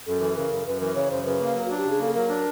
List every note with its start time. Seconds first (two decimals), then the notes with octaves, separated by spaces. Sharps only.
0.07 F#2 A4
0.20 E3
0.36 C#3 A#4
0.51 F#2
0.66 F#2 B4
0.81 E3 A#4
0.95 C#3 C#5
1.11 F#2 C5
1.25 C#3 B4
1.40 A#3
1.55 F#3
1.65 D4 F#4
1.78 G4
1.86 C#3 G#4
1.99 A#3 A4
2.14 F#3 A#4
2.29 D4